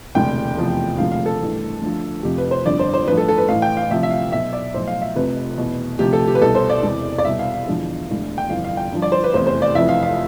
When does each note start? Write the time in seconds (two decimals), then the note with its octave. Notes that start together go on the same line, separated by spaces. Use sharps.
0.15 E1 D2 C3 G5
0.57 F1 E2 C3 F3
0.98 E1 D2 C3 F3 F5
1.12 F5
1.26 A4
1.39 A1 G2 E3
1.81 D2 D3 F3
2.23 F1 F2 C3 F3 G4
2.38 B4
2.51 C5
2.66 G1 F2 D3 D5
2.79 C5
2.94 C5
3.06 A1 G2 F3 B4
3.18 A4
3.28 A4
3.38 B4
3.49 A1 A2 E3 F5
3.62 G5
3.77 F5
3.91 D2 C3 F3 E5
4.03 E5
4.11 F5
4.32 B1 B2 E5
4.53 D5
4.74 B1 A2 F3 C5
4.87 F5
5.02 E5
5.15 F1 F2 C3 F3 B4
5.58 E2 B2
5.99 D2 C3 F3 G4
6.13 A4
6.28 G4
6.35 B4
6.41 C2 B2 A4
6.55 C5
6.70 D5
6.83 E1 E2 C3
7.18 D5
7.25 C2 B2 E5
7.39 F5
7.52 F5
7.67 E1 E2 D3 F3
8.08 E1 D2 D3 F3
8.38 G5
8.50 G1 F2 E3 F5
8.64 F5
8.77 G5
8.92 G1 G2 F3
9.02 D5
9.12 C5
9.24 B4
9.34 F1 E2 C3 C5
9.47 C5
9.62 D5
9.75 F1 F2 E3 E5
9.89 F5
10.03 F5